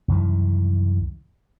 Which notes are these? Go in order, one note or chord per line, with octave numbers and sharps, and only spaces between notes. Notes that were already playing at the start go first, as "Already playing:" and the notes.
C2 F#2 D#3 E3